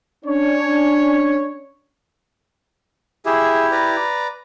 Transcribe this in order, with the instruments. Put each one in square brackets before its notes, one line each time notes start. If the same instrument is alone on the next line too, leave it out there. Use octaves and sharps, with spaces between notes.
[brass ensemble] C#4 D4 C#5
[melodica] E4 G4 [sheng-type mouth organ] G#4 E5
[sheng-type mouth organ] B4 D5 A#5